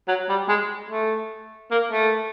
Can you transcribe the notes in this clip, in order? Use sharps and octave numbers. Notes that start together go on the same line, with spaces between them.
F#3
G3
G#3
A3
A#3
A3